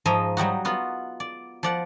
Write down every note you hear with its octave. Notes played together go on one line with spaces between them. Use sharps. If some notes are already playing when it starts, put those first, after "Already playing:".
G#2 F3 D#5 E5 A#5
F#3 G3 D#4 F#4
B3 F4 F#4
D5
F3 D5 F#5